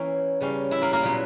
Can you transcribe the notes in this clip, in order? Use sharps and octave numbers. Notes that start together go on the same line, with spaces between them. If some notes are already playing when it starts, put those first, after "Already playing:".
Already playing: E3 A#3 C#4 E4
C#3 G3 A#3 C#4
E4 E5
A#3 A#4
A#3 A#4
A#2 F#3 B3